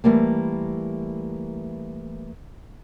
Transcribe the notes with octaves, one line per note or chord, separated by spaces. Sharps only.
E3 G3 A3 A#3